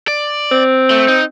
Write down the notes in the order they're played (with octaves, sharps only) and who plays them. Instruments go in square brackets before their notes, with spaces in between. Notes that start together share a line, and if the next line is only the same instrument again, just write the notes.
[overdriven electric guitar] D5
[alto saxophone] C4
[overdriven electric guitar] A3
D#4